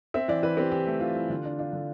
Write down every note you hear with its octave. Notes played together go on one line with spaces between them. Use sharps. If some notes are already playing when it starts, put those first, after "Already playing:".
C4 E5
E3 D5
E3 B4
C4 G4
E3 G4
A3
E3 F4
E3
D3 F4
D4
D4 F4
D3